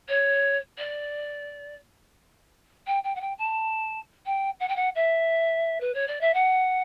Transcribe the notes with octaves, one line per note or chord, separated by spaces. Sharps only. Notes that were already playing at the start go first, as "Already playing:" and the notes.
C#5
D5
G5
G5
F#5
G5
A5
G5
F#5
G5
F#5
E5
B4
C#5
D5
E5
F#5